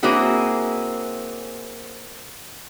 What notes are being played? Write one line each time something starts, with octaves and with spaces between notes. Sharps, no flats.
A#3 C4 C#4 E4 F#4 G#4